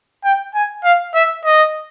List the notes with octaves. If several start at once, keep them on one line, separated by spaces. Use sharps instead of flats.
G5
G#5
F5
E5
D#5